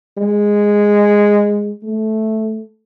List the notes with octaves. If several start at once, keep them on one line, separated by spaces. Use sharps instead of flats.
G#3
A3